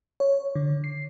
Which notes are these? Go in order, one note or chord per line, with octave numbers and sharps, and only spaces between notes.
C#5
D3
C7